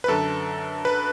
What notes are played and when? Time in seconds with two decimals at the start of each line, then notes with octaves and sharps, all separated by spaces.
0.04 B4
0.08 F#2 D3 A4
0.85 B4